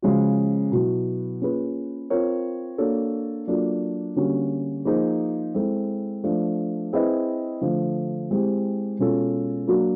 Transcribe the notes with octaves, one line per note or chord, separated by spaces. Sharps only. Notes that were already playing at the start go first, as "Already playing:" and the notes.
C#3 F3 G#3 C#4 F#4
B2 F#3 B3 E4
A#3 C#4 F4 G#4 B4
C4 F4 A#4 C#5
A#3 D4 F#4 A4 C#5
F#3 A#3 D4 F4 A4
D3 G3 A#3 C#4 F#4
F3 A#3 D#4 G#4 C5
G#3 C4 E4 A4
F3 A3 D4
C4 E4 G#4 B4 D#5
D3 F3 A3
G#3 C4 E4 G4
B2 G#3 C#4 F4 A4
F#3 A#3 D4 F#4